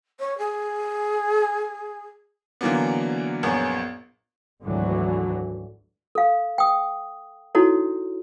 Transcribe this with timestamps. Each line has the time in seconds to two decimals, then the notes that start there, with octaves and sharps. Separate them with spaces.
0.20 C#5
0.38 G#4
2.61 D3 E3 F#3 A#3 B3
3.43 A#1 F#2 B3 G#4 C#5
4.64 G#1 D2 D3 E3 F#3
6.15 A4 F5
6.58 G5 D#6
7.55 D#4 E4 F#4 A4 C#5